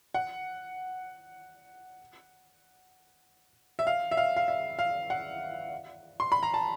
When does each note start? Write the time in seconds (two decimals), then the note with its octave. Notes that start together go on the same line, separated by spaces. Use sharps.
0.14 F#5
3.79 E5
3.87 F5
4.11 E5
4.17 F5
4.36 F5
4.48 E5
4.79 F5
5.10 F#5
6.20 C6
6.32 B5
6.43 A#5
6.54 A5